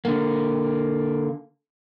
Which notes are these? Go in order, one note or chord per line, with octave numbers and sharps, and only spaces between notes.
D3 A#3